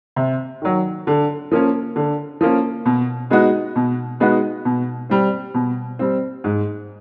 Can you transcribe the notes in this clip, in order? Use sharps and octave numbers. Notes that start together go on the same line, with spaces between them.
C3
D#3 F#3
D3
F3 A#3 C#4
D3
F3 A#3 C#4
B2
G#3 B3 D#4 F#4
B2
G#3 B3 D#4 F#4
B2
G3 C4
B2
G3 C4
G#2